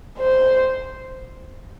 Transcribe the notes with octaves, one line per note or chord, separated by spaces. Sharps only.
C5